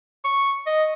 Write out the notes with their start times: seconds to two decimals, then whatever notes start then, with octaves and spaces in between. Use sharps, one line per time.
0.25 C#6
0.67 D#5